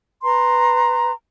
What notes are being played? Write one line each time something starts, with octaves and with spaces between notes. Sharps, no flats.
B4 A#5 C6